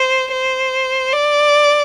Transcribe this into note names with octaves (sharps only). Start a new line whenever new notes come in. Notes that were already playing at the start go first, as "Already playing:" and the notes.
Already playing: C5
C5
D5